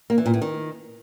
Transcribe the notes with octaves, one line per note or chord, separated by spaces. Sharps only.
A#3
E3
A#2
A2
D#3